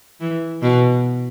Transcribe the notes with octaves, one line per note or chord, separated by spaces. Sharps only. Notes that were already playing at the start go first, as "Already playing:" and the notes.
E3
B2